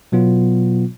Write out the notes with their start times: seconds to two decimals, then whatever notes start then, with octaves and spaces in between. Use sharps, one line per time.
0.12 B2 F#3 B3 F4